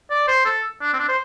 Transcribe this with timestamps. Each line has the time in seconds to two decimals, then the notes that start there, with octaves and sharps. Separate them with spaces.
0.10 D5
0.28 C5
0.45 A4
0.82 D4
0.93 C4
0.99 D4
1.08 C5